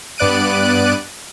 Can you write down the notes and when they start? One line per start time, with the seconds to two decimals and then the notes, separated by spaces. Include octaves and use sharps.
0.18 G2 B3 D5 F#6 D7 D#7